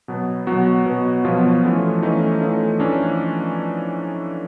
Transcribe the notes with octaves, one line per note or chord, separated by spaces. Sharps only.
B2 F#3 B3
B2 F#3 B3 F#4
B2 F#3 B3
B2 F3 F#3 B3 F4
E3 A3 C#4
E3 A3 C#4 D#4
E3 A3 C#4
E3 A3 C#4 D4